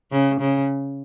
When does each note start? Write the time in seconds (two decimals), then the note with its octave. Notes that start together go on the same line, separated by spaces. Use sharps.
0.12 C#3
0.41 C#3